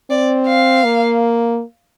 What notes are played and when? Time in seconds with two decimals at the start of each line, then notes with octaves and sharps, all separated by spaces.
0.10 C4 D5
0.47 F5
0.84 A#3